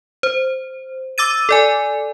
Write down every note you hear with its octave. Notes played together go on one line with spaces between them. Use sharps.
C5
D6 E6 A6 D#7
A4 D5 G#5